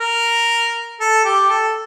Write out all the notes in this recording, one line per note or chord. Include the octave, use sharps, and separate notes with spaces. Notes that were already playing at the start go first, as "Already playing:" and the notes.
A#4
A4
G4
A4